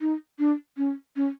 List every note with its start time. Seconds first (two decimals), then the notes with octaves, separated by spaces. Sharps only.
0.01 D#4
0.39 D4
0.77 C#4
1.16 C#4